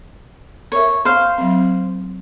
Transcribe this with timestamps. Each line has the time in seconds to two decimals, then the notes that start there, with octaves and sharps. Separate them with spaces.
0.72 A#4 C#5 E5
1.05 C5 F5
1.38 F#3 C4